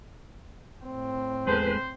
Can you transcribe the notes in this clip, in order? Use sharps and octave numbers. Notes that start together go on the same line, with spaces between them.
A2 C4
E2 G#3 G#4 A4 B4 C5